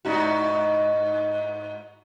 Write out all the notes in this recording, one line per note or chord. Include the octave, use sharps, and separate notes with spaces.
G#2 D#4 F#4